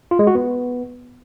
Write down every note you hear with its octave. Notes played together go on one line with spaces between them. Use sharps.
F4
G#3
F#4
B3